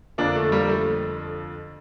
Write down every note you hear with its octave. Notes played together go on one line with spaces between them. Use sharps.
F2 D3 F3 A#3 D4
A3
G3 A#3
A3